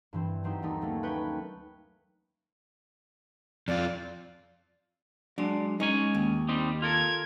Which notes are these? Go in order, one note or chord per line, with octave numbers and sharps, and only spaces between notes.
G2 E3 C4
F#3 C4 D#4 G4
D#2 G3 A3 D#4
F#3 A3 A#3 C#4
B4 C#5 G5
F2 F4 D5
F#3 G#3 D4
G#3 C#4 D#4 G#5
D#2
G3 C4 D#4
F4 A4 A#4 G#6